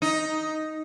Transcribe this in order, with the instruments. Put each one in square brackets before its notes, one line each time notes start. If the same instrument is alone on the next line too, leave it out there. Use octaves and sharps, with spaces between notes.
[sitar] D#4